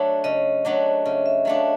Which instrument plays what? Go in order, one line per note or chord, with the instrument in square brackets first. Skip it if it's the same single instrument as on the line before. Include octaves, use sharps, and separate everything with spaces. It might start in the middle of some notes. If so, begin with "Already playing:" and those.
Already playing: [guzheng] F#3 A3 D4 [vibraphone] E5
[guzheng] C#3 [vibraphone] D#5
[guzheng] F#3 A3 D4
[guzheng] C#3 [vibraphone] E5
[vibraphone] E5
[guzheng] F#3 A3 D4 [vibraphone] F5